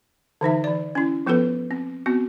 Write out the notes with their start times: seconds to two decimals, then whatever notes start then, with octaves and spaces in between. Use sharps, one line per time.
0.41 D3 E3 D#4 E5
0.64 E3 D5
0.95 C#4 E4
1.26 F3 B3 F4 A4 B4
1.71 C4
2.06 B3 C4 F#4